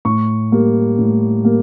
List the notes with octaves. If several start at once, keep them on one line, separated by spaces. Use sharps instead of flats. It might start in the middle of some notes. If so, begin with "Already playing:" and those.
A2 C#6
G3 A#3
A2
G3 A#3